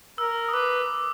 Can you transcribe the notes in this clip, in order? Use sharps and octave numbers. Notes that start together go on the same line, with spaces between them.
A#4 E6
D#6
B4 D6